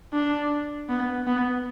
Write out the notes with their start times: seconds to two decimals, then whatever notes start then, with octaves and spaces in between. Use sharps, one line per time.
0.13 D4
0.89 B3
1.27 B3